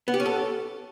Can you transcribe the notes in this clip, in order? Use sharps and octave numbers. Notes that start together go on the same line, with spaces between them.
B3
G4
C#4
A4